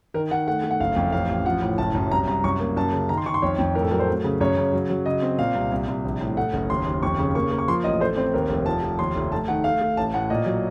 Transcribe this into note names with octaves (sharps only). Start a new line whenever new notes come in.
D#3 A#4
D#3 F#5
A3 F#5
A3
F#5
F#1 F5
F2
A1 F5
A1
F3 F#5
A2
F#1 A5
F#2
C2 A#5
C2 A#5
F#2 C#6
A#3
F#2 A5
C#3
D#3 A#5
C6
D#3 C#6
C6
F2 C#5
F2
A2 A#4
A4
F#3 A#4
C5
A3
C#3
F#2 C#5
C#3
F#3
F#3
C#3 D#5
C4
A#2 F5
C2
C2
C2
A#1
A2
A3 F#5
F#1
D#2 C6
D#2
F2 C#6
C#3
A#3 C#6
A#3
C#6
F3 C6
A1 D#5
A3 C5
C4 C5
D#2 A#4
F1
F3 A5
F3
D#2 C6
F1
A3 A5
D#3 F#5
A3 F5
A3
A1 A5
A2 F#5
A#2 D#5
F#3